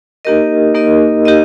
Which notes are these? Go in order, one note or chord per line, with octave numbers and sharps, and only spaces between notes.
A#3 D#4 G4 A#4 D#5
A#3 D#4 G4 A#4 D#5
D#4 G4 A#4 D#5